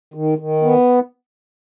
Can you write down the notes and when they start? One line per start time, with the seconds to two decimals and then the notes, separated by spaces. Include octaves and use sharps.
0.14 D#3
0.38 D#3
0.63 B3